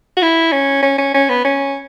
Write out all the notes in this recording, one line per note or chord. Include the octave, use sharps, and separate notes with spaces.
F#4
E4
C#4
C#4
C#4
C#4
B3
C#4